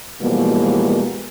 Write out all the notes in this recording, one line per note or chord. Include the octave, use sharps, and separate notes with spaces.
B2 E3 F3 G3 G#3 A#3